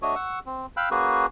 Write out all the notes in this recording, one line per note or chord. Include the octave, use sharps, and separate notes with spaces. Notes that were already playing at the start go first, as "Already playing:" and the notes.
A3 D4 F#4 C#5 D#5
F#5 C#6 E6
C4
F5 G5 B5 E6 F#6
A#3 C#4 F#4 G#4 B4